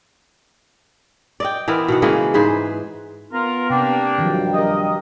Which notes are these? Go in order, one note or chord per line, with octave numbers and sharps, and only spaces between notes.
D5 D#5 G5
E3 B3 C4 A#4
B2 D#3 F#5
C#3 E3 G#3 A#3
G#2 G#4 B4 C5
B3 F4 A#4
C3 A#3 D4 G5
G2 D#3 F3 F#3
G4 A#4 D#5